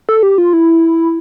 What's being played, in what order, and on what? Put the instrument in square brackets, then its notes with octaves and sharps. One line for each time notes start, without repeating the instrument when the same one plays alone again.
[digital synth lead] A4
G4
F4
E4